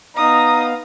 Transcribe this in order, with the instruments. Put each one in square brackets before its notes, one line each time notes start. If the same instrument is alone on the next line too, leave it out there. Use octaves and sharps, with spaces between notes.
[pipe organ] B3 F5 [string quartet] D#4 [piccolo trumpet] A#5 [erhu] D#6